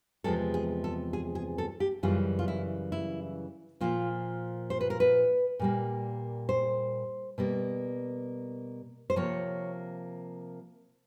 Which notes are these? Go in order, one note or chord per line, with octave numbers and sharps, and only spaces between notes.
E2 C3 F3 G#3 A4
G#4
A4
G#4
G#4
A4
G4
F#2 C#3 E3 G3 F4
F4
E4
E4
A#2 F3 A#3 F4
C5
B4
A#4
B4
A#2 G3 A#3
C5
B2 G3 A#3
C5
C3 F3 A#3 C#5